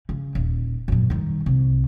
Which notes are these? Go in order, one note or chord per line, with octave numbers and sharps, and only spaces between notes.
C#3
D#1
F#2 A#2
D#3 G3
C2